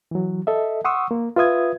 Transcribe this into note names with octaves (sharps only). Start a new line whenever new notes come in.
E3 F#3
A4 D#5 E5
F#5 C6 C#6 D#6 E6
A#3
F4 B4 E5 D#6 G#6